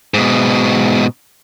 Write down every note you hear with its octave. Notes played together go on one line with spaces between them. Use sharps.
G#2 B2